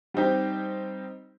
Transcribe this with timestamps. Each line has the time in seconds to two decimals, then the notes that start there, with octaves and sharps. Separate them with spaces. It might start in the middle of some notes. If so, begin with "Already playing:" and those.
0.14 G3 C4 D#4 G4